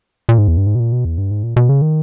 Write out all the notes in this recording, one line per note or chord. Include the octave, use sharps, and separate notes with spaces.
A#2
G#2
E2
G2
G#2
B2
A#2
B2
E2
G2
G#2
A#2
B2
C#3
D#3